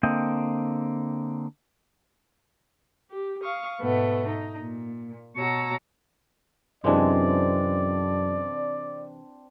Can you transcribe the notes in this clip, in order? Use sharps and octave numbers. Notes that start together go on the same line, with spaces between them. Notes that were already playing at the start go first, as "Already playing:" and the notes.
D3 A#3 C4 D#5 G5
G4
F5 C#6 D#6
G#2 B2 A3 B3
D#4
A#2
B2 F#4 C#5 A5 A#5 E6
F#2 C3 E3 G#3 C4 D4 D5